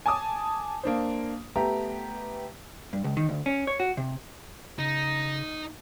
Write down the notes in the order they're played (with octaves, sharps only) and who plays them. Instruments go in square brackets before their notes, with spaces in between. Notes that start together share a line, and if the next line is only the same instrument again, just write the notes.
[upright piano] G#5 A5 D6 D#6
A#3 D4 C5
A3 B3 G4 A#5
[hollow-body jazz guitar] G2
C#2
D#3
D2
C#4
C#5
F#4
C3
[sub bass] C#3 [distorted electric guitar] D#4 [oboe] A#5